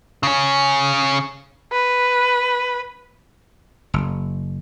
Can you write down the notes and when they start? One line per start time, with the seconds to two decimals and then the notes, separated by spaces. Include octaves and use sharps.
0.23 C#3 C#4
1.72 B4
3.94 F#1